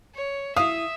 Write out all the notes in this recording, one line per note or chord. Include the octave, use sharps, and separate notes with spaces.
C#5
E4 E5 F5 D#6